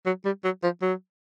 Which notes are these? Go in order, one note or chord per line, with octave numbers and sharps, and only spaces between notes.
F#3
G3
F#3
F3
F#3